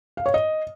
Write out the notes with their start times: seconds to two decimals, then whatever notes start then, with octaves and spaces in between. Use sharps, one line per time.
0.17 F5
0.26 C#5
0.34 D#5